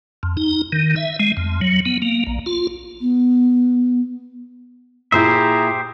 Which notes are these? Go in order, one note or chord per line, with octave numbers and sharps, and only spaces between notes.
F2
D#4
D#3
E5
G#3
F2
F#3
B3
A#3
A#1
F4
B3
A#2 E4 G4 G#4 C5 E5 A#5